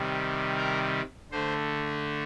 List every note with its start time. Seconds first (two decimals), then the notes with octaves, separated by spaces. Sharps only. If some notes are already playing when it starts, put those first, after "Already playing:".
Already playing: C3 D#3 G3
0.57 A#4
1.31 D3 A3 C5